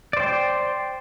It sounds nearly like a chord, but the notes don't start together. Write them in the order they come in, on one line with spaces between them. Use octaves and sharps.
D5 C5 G5